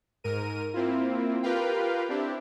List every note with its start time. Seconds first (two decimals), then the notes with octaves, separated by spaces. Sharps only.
0.24 G#2 A#4 D#7
0.74 A#3 C4 E4 F4
1.43 F4 G4 A#4 B4 F5 G5
2.09 C4 D4 E4 G4